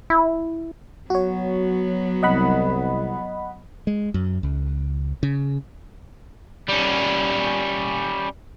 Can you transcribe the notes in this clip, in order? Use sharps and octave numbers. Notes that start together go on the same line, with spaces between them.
E4
F#3 B3 F#4 C#5
C2 D#5 F#5 B5
G#3
F#2
C#2
C#3
G3 C#4